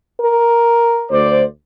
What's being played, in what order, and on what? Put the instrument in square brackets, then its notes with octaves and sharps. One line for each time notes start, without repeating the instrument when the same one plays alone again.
[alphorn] A#4
[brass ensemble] D2 C5 D5